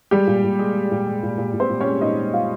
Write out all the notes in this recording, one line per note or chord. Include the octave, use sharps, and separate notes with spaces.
G3 G#3 G4
A#2
A#2
G#3
G#3
A#2
G#3
A#2
A#2
A#2
C4 C5
A#2
G#3 C#4 C#5
A#2 D#4 D#5
G#3
G#3 F4 F5